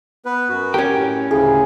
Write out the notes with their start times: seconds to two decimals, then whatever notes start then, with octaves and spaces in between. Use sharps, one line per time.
0.25 B3 B4
0.49 F#2 F#4
0.74 C#4 G4 A#4
0.94 A2
1.31 D2 A2 C#3 G#4